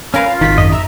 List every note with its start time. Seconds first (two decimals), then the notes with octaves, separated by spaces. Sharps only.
0.14 C#4 A#4 B4 F5
0.28 F4
0.41 G#1 D#3 B6
0.58 F#2 D#5
0.72 E5 A#5